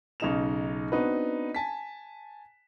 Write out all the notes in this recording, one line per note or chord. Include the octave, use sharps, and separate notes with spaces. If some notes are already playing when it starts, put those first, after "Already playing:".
B1 C#3 D#4 G#4 E7 F7
B3 C4 D4 D#4 F#4 B4
G#5 A5 B6